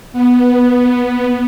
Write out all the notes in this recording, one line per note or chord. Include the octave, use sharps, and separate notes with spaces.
B3